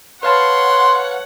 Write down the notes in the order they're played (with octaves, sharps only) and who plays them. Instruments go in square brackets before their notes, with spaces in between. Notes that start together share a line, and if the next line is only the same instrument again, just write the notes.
[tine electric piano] B4 F5 A5 [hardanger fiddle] C#5 [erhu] F#5 [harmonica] C6